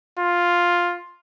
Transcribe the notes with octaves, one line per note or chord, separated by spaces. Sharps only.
F4